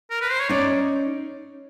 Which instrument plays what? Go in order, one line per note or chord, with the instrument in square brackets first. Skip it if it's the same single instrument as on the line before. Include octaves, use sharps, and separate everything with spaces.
[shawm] A#4
B4
C5
C#5
[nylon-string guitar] C#4 D#4 [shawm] D5